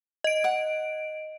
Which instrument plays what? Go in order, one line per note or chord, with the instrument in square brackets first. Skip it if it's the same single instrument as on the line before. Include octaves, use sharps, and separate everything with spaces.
[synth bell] D#5 D7
[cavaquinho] F#5